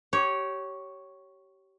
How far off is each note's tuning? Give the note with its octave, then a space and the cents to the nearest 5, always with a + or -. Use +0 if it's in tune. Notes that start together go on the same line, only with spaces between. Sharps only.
G4 -25 C#5 +0